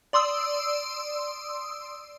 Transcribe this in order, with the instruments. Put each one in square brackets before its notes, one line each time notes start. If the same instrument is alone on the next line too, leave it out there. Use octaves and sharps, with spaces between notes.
[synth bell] D5 C6 D#6 E6